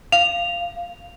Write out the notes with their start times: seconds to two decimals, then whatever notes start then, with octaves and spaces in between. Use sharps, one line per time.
0.12 F5 F7